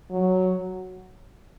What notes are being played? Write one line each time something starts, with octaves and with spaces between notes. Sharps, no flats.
F#3